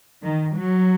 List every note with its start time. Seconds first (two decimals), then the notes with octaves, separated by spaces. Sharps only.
0.23 D#3
0.55 F#3